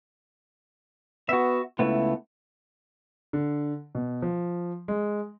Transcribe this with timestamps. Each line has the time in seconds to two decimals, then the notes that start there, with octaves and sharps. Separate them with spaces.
1.29 B3 F#4 E5
1.79 C#2 A3 B3 E4
3.33 D3
3.95 B2
4.22 F3
4.88 G#3